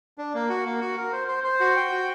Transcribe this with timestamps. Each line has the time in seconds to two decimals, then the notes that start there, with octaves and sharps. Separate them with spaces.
0.18 D4
0.34 A#3
0.49 F#4
0.65 A#3
0.81 F#4
0.97 A#4
1.12 C5
1.28 C5
1.44 C5
1.60 F#4
1.76 G5
1.92 F#4